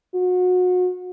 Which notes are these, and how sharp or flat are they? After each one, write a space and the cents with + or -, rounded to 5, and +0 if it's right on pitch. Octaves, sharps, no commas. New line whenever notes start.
F#4 -30